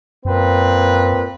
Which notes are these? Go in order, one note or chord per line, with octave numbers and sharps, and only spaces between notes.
F#2 A#2 C4 B4